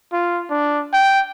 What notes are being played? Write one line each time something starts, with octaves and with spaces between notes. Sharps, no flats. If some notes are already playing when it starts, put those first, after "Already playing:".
F4
D4
G5